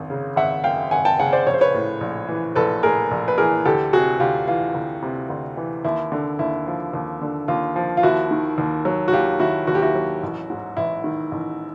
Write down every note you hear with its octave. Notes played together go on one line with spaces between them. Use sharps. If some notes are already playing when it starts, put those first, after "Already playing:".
Already playing: G#1 F#2
C#3
G#1 E5 F#5
F#2 F5 G5
G#1 F#5 G#5
G5 A5
C#3 F#5 G#5
C5 D5
A#1 C#5
C5
B4 C#5
A2
A#1
E3
A#1 A4 B4
A2 G#4 A#4
A#1
B4
E3 G#4 A#4
D2 G4 A4
C3 F#4 G#4
D2 F4 G4
E3 F4
D2
C3
D2
E3
D#2 E4
D3
D#2 E4
F3
D#2
D3
D#2 F4
F3
F4
D#2 E4 F#4
D#3
D#2
F#3
F#4
D#2 F4 G4
D#3 E4 F#4
D#2 F#4
G4
E4 F#4
F#3
A1
G#2
A1 E4
D#3
A1